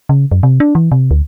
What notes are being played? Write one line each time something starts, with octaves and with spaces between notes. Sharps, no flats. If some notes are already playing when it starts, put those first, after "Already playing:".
C#3
F#2
C3
D4
E3
C3
D2